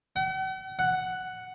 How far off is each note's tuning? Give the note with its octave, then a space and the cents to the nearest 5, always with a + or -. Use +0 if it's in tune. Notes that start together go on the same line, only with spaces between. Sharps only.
F#5 +45
F#5 +5